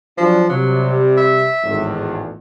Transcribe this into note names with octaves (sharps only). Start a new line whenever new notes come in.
F3 F#3 C#4 D4
C3 F#3 G3
E5
G#1 E2 A2